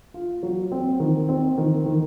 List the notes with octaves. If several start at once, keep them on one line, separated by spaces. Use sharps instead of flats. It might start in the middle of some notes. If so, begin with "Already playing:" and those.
F4
F#3
C4
D#3
C4
D#3
D#3